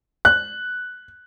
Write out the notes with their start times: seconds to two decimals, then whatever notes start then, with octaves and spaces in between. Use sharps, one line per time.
0.25 F#6